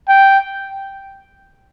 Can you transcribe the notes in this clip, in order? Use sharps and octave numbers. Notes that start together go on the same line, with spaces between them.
G5